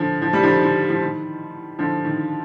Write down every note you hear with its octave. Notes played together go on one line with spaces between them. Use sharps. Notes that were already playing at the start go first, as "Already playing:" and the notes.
Already playing: D3 F3
F3
G3
D3 F3
D#3
D3
F3
D#3
D3 F3
D#3